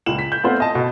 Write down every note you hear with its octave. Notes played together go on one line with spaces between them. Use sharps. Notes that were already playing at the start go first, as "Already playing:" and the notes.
C#2 A#2 E7 F#7
B6
G6
A3 B3 C4 F4 C5
D#5 A5
B2